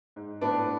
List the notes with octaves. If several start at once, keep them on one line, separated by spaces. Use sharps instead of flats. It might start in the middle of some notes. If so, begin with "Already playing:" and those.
G#2
A2 B3 D4